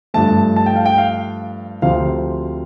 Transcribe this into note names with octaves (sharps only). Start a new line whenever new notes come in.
G2 F3 A3 A5
A5
G5
F5
G5
F5
D2 C3 F3 C4 F5